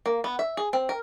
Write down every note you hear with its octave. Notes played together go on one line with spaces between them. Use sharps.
A#3
B3
E5
G#4
C4
A#4